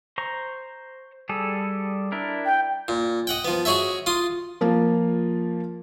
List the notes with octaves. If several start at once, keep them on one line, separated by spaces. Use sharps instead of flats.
C5 A#5 C#6
G3 G#4 A4
D4 E4 A#4
G5
A#2
D#5 F#5 G5
F3 B3
F#4 G#4 C#5 D#5 E5
F4 C6 D#6
F3 A#3 F4